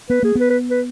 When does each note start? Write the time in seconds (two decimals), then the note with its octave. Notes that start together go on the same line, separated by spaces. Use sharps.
0.10 B3 B4
0.23 A#3 G#4
0.35 B3 B4
0.50 B4
0.70 B4